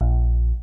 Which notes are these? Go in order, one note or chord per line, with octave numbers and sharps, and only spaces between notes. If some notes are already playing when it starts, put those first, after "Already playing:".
A#1